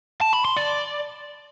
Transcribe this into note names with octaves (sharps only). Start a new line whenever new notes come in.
A5
B5
C6
D5